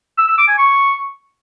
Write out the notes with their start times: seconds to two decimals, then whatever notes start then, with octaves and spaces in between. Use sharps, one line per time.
0.18 E6
0.28 E6
0.38 D6
0.48 G#5
0.58 C#6